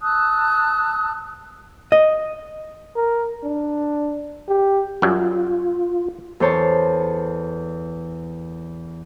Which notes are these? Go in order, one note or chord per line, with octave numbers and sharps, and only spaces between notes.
A5 D#6 E6 F#6
D#5
A#4
D4
G4
F#2 F#3 G3 F4
E2 A4 C5 C#5 A5